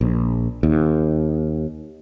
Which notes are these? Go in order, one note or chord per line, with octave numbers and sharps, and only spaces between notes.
A#1
D#2